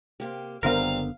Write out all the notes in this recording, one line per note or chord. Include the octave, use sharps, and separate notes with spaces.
C3 A#3 G4
F#1 D3 G3 B3 C4 F4 A#4 F5